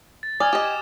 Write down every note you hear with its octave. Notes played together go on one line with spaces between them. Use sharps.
A6
D5 G#5 D#6 F6 G#6
G4 D#5 D6
E7